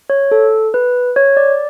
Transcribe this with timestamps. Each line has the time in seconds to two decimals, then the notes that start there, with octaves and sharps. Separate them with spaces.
0.10 C#5
0.31 A4
0.74 B4
1.16 C#5
1.37 D5